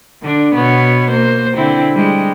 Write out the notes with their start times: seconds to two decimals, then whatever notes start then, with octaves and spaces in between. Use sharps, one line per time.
0.23 D3 D4
0.54 B2 B3 C#5
1.10 A#3 C5
1.56 D3 C4 E4
1.94 G3 G#3